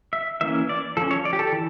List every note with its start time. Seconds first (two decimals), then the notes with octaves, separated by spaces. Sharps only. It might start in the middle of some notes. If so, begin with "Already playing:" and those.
0.13 E5
0.41 E3 A#3 C#4 E5
0.69 D5
0.97 F3 C#4 A4
1.11 C#5
1.25 D5
1.33 G4
1.39 A4
1.52 E3